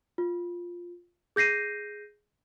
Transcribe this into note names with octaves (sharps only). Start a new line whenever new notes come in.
F4
G#4 G6 A#6 C7 D#7